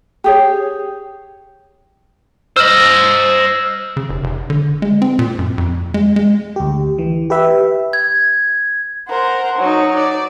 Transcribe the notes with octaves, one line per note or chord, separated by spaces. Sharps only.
G4 G#4 C#5
C5 D#5 E6 F6
C#3
F1
F1
D3
G#3
C4
A#2
F#2
F2
G#3
G#3
D2 G4
E3
G4 B4 E5
G#6
A#4 C5 F#5
F#3 D#4
D5